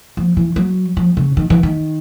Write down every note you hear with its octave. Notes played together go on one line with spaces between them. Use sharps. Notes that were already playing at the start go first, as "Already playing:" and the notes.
F3
E3
F#3
F3
C#3
D#3
E3
D#3